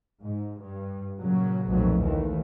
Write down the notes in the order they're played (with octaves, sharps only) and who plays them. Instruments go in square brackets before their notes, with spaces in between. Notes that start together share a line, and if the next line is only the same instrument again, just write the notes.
[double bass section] G#2
G2
A#2 C#3 F#3
B1 F2 A#2 F#3 A3
D#2 D#3 E3 A3